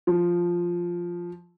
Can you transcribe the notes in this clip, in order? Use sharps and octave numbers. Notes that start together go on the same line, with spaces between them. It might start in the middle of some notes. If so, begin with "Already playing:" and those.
F3